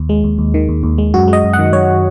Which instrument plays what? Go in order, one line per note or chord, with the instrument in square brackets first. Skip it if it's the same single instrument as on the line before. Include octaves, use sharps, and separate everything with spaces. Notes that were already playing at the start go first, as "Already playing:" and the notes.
Already playing: [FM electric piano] D#2
G#3
D#2
D#2
D#3
D#2
D#2
G#3
F#2 F#4
G#3
D#5
F#2
F#5
D#3
F#2 C#5